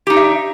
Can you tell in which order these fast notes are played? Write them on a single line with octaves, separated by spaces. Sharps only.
G4 D#4 D4 E5